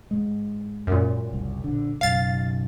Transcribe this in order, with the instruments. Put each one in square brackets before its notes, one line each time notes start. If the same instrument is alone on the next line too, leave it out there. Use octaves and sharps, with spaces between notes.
[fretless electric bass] G#2 G#3
[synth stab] F#2 A#2
[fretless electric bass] F#1 C2
A#1 D3
[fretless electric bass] F#1 B1 F#2 [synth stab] F5 A6